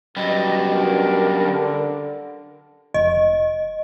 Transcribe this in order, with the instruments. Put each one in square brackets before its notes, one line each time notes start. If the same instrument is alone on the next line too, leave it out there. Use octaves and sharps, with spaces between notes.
[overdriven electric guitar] F#2 G3 [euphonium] B2 [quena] D#5
[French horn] D4 [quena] A#4
[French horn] D3
[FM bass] F1 [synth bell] D#5